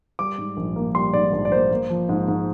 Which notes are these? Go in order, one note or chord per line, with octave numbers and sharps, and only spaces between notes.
G3 D6
G#2
A#1
A#3
G3 C6
G#2 D5
A#1
D5
A#3 C5
A#3
F3
G#2
G#2